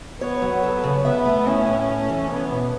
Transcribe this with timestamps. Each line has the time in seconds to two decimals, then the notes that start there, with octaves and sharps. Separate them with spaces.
0.21 B3 C#5
0.42 F#3
0.63 A4
0.84 C#3
1.04 B3 E5
1.25 A3
1.47 C#4 E4
1.68 A2
1.88 A4
2.09 E3
2.31 B3 C#5
2.51 B2